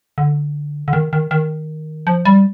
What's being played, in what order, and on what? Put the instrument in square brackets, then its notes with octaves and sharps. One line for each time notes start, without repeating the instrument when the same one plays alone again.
[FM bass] D3
D3
D#3
D#3
D#3
F3
G3